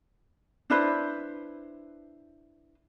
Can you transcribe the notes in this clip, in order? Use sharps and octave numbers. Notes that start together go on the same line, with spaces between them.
D4 E4 B4 C5